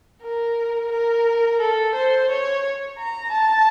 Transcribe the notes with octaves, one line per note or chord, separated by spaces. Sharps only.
A#4
A#4
A4
C5
C#5
A#5
A5